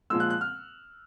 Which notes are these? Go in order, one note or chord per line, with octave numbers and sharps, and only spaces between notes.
A#2 F3 G#3 E6
F#6
F#6
F6